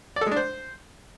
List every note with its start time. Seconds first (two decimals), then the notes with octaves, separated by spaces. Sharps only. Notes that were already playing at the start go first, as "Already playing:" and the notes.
0.16 D5
0.21 A4
0.26 G#3
0.31 D4
0.36 C5